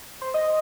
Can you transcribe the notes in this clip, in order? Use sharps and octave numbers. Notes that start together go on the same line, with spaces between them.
C5
D#5